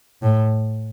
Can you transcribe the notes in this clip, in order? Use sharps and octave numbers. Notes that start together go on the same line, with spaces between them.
A2